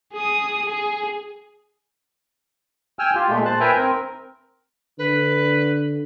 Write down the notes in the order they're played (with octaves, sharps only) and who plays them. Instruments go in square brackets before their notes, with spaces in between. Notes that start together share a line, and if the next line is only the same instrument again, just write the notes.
[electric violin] G#4 D#6
G#4
[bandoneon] G5 G#5 E6 F6
F4 G4
A#2 G#3 A3
A#2 C5 A5 F#6
A#4 B4 E5 G5 G#5 A#5
C4 A#4
[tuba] D3 [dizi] B4